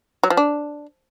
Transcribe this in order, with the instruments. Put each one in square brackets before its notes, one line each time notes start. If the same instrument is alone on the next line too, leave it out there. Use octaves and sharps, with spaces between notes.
[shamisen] F#3
F3
D4